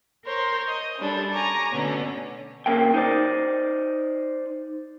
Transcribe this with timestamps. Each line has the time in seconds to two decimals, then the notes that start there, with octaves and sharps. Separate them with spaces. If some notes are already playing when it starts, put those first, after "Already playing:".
0.24 A#4 C5 C#5 C6
0.68 D#5
0.99 F#2 G3 D4 A4
1.33 G#5 A#5 C#6 D6
1.72 B2 D3 A3 B3 C#4
2.66 B1 C#3 A#3 G5
2.94 D#4 C5 D5